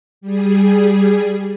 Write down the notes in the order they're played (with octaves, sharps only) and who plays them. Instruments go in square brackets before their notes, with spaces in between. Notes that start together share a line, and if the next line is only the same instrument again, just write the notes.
[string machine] G3 G#4